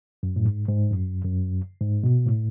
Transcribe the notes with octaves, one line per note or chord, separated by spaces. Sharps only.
F#2
A2
G#2
G#2
F#2
F#2
G#2
B2
A2